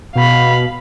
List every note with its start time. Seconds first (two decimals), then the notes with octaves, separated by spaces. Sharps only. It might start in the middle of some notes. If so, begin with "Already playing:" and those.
0.15 B2 F5 B5